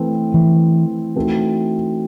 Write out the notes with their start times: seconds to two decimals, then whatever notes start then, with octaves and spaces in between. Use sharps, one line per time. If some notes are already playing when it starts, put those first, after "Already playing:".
Already playing: E3 A3 C4
0.34 E3
1.16 E3 A3 C4 D#4 F#4